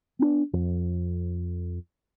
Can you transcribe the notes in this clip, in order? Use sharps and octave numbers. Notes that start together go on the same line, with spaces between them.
B3 D4
F2